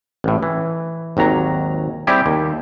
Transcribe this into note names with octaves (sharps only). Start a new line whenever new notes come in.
A1 A2
E3
G#1 D#2 F#3 A#5
G3 C4 E4 G4 G#4
D#2